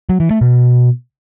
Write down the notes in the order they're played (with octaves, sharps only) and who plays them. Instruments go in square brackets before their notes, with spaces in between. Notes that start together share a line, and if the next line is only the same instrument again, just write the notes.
[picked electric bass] F#3
E3
A3
B2